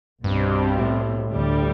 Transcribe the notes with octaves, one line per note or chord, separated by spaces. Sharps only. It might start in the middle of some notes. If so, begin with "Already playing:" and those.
C2 G2 B2 G3 C4
A2
D2 D3 G3